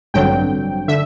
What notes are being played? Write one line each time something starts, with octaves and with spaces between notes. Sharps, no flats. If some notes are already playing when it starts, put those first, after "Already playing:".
A1 G2 D3 F#3 C4 G5
D3 E5